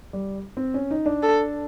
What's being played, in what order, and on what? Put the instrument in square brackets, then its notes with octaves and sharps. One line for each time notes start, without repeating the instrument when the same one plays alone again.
[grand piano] G3
C4
C#4
D#4
D4
[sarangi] A4